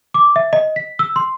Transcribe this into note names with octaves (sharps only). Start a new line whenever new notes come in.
D6
E5
D#5
B6
E6
C6